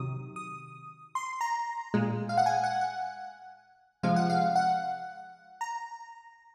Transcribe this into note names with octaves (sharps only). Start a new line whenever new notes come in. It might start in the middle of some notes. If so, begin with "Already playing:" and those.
Already playing: C3 D#3 F#3 D#6
D#6
C6
A#5
A#2 G#3
F5
F#5
G#5
F#5
F#5
C3 F3 G#3 F5
F#5
F5
F#5
A#5